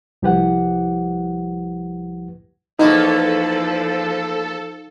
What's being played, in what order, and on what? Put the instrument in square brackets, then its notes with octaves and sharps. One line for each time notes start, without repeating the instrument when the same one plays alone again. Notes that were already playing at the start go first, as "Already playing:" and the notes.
[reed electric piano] C2 F3 E4 G4 B4 F#5
[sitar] E2 A#3 B3 [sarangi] F3 [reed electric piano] D#4 [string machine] A4